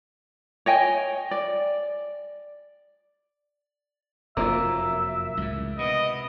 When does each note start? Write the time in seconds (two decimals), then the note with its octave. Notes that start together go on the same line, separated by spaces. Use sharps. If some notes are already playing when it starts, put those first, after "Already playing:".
0.66 C#5 D#5 G5 G#5
1.31 D5
4.37 F1 F#2 F#3 A#3 F4 E5
5.37 C#2 A2
5.79 C3 B3 D#5